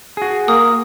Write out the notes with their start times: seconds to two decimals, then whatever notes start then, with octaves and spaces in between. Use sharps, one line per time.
0.17 F#4 G#4
0.48 A#3 D#6